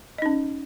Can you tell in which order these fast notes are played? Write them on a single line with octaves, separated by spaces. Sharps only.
D#5 D#4 C#4